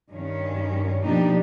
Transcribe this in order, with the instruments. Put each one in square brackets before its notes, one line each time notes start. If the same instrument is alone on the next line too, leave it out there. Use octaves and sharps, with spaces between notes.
[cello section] G2 D#3 C#4
B2 F3 A#3 D4 D#4 G4